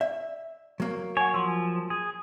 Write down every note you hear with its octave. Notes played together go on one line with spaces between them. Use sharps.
D5 E5
F#3 A#3
C#5 F#5 G#5
F3 C6 E6
G#4